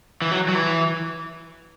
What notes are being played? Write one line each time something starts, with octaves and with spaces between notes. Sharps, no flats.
E3
F#3
F#3
E3